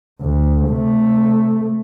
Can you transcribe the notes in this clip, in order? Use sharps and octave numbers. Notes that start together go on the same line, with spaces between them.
D2
C3 A3